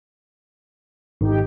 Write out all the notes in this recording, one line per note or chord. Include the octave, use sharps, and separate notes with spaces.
G#1 D#4 G4 G5